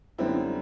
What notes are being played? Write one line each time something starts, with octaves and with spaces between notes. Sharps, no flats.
F#2 D3 G3 B3 C4 E4